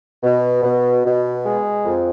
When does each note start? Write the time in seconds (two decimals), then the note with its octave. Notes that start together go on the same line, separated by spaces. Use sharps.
0.23 B2
0.63 B2
1.04 B2
1.45 G#3
1.85 F2